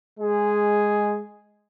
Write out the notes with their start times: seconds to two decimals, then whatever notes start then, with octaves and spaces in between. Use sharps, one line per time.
0.19 G#3 G#4